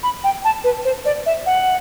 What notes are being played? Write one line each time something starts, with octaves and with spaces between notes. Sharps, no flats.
B5
G5
A5
B4
C5
D5
E5
F#5